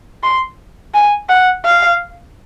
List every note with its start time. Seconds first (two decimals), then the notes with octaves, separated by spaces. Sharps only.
0.23 C6
0.94 G#5
1.29 F#5
1.65 F5